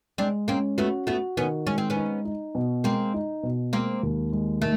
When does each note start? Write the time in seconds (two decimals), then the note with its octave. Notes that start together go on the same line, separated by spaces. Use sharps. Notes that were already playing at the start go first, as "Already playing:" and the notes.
0.18 G#3 C4 D4
0.48 A#3 C4 C#4
0.78 A3 B3 F#4
1.07 A3 B3 F#4
1.37 D#3 B3 C#4
1.67 G#3 C#4
1.78 C4
1.90 B3 C#4
1.96 D#4
2.25 D#4
2.55 B2
2.84 G#3 A#3 C4
3.14 D#4
3.43 B2
3.73 G#3 A#3 C4
4.03 D#2
4.33 G#3
4.61 D#3 A3